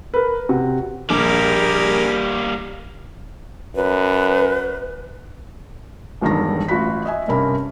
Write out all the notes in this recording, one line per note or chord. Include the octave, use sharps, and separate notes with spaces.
A#4 B4
C3 F#4
A#1 G3 A#3 G4 G#4 A#4
F#2 B4
E1 B1 G2 D#3 A#5 A#6
A1 F4 F#4 B5 B6
D#5 E5 G#5
G2 C3 C#4 A#4 B5